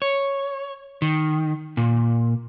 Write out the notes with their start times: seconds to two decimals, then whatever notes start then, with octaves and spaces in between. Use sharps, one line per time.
0.02 C#5
1.02 D#3
1.77 A#2